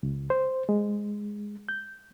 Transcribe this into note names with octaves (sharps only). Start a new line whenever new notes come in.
C#2
C5
G#3
G6